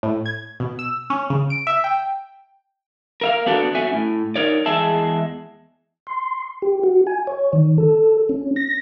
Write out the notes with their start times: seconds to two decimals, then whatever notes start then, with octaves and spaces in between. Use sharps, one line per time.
0.03 A2
0.26 G#6
0.60 B2
0.79 E6
1.10 C#4
1.30 C#3
1.50 D7
1.67 E5
1.84 G5
3.21 A#4 E5 F5
3.46 B3 D4 F#4 A4
3.75 C#4 F#4 E5 G#5
3.93 A2
4.36 D#4 A#4 C#5 D5
4.66 E2 G#3 G#4 E5 A5
6.07 C6
6.62 G4
6.83 F#4
7.07 G#5
7.27 C#5
7.53 D#3
7.78 A4
8.29 C#4
8.56 A#6